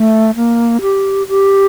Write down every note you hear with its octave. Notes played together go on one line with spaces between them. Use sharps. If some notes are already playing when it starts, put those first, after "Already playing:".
Already playing: A3
A#3
G4
G4